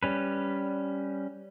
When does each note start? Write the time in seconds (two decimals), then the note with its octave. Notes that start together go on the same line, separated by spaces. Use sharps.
0.03 G3 C#4 B4